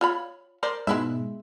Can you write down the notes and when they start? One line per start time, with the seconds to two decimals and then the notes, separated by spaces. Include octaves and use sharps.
0.01 F4 C#5 B5
0.63 A#4 C5 D5
0.87 G#2 B2 G#3 E4 E5